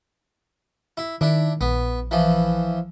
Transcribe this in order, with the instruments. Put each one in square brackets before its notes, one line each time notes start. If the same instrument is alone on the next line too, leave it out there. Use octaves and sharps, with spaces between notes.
[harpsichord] E4
[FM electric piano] D#3 [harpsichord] D4 E4
[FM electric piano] A#1 [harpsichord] B3
[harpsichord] E3 F3